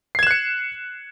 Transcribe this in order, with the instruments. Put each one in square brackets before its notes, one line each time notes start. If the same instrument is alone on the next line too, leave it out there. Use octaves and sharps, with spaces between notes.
[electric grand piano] C7
G#6
E7
F#6
C#7